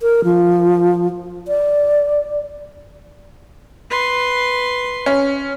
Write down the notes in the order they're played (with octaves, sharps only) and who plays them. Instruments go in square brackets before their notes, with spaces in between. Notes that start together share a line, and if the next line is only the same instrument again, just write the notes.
[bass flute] A#4
F3
D5
[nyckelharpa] B4 C6
[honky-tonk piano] C#4